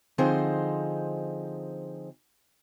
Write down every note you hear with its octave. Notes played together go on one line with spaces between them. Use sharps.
D3 F3 C4 D#4 G#4 C5